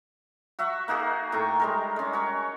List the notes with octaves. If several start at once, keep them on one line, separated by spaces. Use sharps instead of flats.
F#4 E5 F#5 C#6
A#3 D#4 F#4 G#4
A2 G5 A#5 C#6
G3 G#3 A#4
G#3 C#4
F#4 C#5